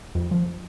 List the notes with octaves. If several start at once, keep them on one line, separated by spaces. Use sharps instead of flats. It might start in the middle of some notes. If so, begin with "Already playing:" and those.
F2
F3